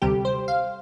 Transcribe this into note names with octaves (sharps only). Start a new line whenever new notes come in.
D2 C3 G3 G4
C5
F5